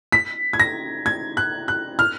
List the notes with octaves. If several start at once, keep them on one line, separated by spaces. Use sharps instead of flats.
B6
G#6
A#6
G#6
F#6
F#6
F6